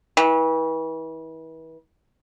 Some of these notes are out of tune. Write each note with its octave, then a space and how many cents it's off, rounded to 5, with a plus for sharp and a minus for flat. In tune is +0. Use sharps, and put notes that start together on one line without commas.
E3 -35